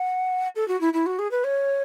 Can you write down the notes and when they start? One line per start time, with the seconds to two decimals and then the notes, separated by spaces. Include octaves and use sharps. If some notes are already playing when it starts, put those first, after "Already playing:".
Already playing: F#5
0.56 A4
0.68 F#4
0.81 E4
0.93 E4
1.06 F#4
1.19 G#4
1.31 B4
1.44 C#5